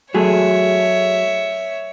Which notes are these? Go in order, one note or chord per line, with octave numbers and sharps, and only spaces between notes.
F#3 A3 G#4 C#5 E5